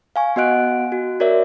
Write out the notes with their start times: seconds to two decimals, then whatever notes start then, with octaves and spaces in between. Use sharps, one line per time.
0.16 F5 G#5 C#6
0.36 B3 F#4 D#5 F#5 F#6 D7
0.92 F#4
1.20 F#4 A#4 C#5 D5 E5